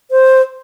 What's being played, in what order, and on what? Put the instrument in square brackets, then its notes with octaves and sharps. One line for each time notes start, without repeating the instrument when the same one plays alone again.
[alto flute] C5